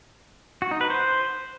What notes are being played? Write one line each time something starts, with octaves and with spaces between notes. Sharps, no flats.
F#4
D#4
B4
C5